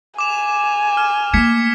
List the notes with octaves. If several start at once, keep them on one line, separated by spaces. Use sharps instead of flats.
G#5 D6 E7 F7
F6
A3 A#3 G#6 B6 C#7